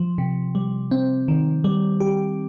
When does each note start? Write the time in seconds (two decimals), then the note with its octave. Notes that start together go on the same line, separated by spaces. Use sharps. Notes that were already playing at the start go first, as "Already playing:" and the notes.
Already playing: F3
0.18 C3
0.55 G3
0.91 C4
1.28 D#3
1.64 G3
2.00 G4